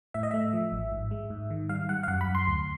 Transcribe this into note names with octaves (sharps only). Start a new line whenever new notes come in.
A2 E5
D#5
A3 E5
F3
A1
G#2
G#3
G#2
D#3
G3 F5
G3 F#5
F5
F#2 F#5
B5
F#2
C6
D2